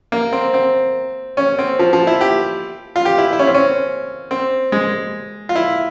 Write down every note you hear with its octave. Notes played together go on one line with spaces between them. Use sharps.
A#3
C4
C4
C#4
C4
F3
F3
E4
G4
F4
G4
E4
E4
C#4
C4
C#4
C4
G#3
F4
E4